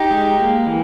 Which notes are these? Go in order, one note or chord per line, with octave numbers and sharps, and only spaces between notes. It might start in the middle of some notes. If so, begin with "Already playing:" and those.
Already playing: D#4 G4
G#3
A#3
E3